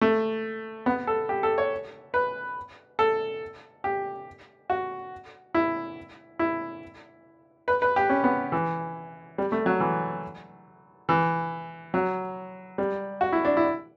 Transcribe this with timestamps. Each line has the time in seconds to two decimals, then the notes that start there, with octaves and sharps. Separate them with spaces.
0.01 A3
0.86 B3
1.07 A4
1.29 G4
1.43 A4
1.58 C#5
2.14 B4
2.99 A4
3.84 G4
4.70 F#4
5.54 E4
6.39 E4
7.68 B4
7.82 B4
7.96 G4
8.09 C#4
8.24 B3
8.52 E3
9.38 G3
9.52 A3
9.66 F#3
9.80 E3
11.09 E3
11.94 F#3
12.78 G3
13.21 F#4
13.33 E4
13.45 D4
13.57 E4